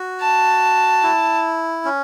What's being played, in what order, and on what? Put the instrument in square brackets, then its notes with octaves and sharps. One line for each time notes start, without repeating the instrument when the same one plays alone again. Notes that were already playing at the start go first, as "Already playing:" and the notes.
Already playing: [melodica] F#4
[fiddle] A5
[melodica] E4
C#4